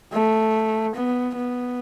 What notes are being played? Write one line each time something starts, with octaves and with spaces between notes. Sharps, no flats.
A3
B3
B3